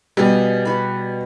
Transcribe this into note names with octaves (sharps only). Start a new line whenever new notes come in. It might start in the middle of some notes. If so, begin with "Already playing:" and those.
B2 G3 G#4
F#4 B4